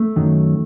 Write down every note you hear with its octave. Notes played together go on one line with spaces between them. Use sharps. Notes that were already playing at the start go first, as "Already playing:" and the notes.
Already playing: A3
F#2 D#3 F#3